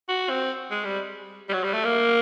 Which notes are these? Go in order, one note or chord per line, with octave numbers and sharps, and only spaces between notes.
F#4
C4
G#3
G3
G3
F#3
G3
A3
A#3